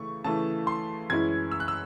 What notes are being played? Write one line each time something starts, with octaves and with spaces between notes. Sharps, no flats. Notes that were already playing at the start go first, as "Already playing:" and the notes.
Already playing: C#3 E3 A3 C#6
C#3 E3 A3 A5
C6
F#2 E3 G#3 C#4 E4 G#6
E6
F#6
E6